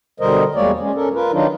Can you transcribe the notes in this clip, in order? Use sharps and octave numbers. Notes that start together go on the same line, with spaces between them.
B2 D3 G3 A#4 C5 D#5
E2 G3 G#3 A#3 C#5 D5
G#3 C#4
C#4 A4 A#4
F4 A#4 B4
D#3 F#3 D4 D#4 F4